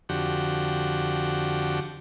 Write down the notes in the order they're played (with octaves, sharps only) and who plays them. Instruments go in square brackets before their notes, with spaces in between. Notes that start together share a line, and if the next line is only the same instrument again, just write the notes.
[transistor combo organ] F2 D3 F#4 G4